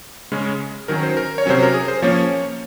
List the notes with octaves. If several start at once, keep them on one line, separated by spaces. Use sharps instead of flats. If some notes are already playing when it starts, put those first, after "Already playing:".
C#3 G#3 C#4
D#3 F#3 C#4 A#4
C5
A#4
C#5
C3 F#3 C#4 C5
A#4
G#4
C5
F3 A#3 C#4 C#5